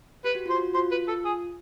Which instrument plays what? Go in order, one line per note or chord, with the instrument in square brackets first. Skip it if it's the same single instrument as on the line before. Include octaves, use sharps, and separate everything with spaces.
[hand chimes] G4 [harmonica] B4
[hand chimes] F#4
[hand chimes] F4 [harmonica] C5
[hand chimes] F#4
[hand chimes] F4 [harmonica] C5
[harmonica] B4
A4
G#4